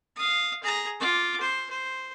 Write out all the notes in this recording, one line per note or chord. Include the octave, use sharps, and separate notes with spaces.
F5 D#6
G#4 A#5
F4 D6
C5
C5